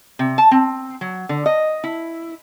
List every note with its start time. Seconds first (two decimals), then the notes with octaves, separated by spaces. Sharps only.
0.19 C3
0.38 A5
0.51 C4
1.01 F#3
1.29 D3
1.46 D#5
1.84 E4